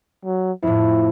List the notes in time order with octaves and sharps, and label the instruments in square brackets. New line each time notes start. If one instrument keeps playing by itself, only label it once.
[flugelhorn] F#3
[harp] F2 A2 [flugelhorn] E4